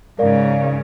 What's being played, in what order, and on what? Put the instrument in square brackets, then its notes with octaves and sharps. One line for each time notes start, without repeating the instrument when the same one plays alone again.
[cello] G#2 C#3 [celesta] A#4 D5 F5